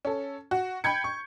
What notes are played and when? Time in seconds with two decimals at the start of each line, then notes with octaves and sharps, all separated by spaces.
0.05 C#4 A4
0.51 F#4
0.84 G5 B5 G6 G#6 C#7
1.04 C#6